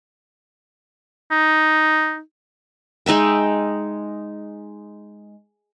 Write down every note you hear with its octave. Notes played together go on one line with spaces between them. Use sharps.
D#4
G#3 D#4 E5 G5